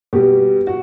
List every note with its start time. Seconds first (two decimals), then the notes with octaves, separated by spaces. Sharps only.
0.13 B2 G3 G4
0.67 F#4